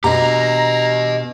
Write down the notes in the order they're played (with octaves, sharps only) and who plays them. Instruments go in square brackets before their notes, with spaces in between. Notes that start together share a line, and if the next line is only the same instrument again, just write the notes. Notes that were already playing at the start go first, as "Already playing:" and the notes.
[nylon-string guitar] B2 D4 [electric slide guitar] G4 D#5 [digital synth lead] A#5